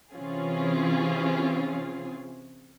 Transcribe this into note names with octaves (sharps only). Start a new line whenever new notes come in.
C3 E3 C4 C#4 F4 G#4